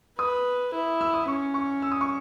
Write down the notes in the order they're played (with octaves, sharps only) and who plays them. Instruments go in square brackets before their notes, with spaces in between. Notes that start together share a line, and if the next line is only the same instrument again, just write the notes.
[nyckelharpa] B4 [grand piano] D#6
[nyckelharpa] E4
[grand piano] E6
D#6
[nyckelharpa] C#4 [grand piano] C#6
[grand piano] C#6
E6
D#6
C#6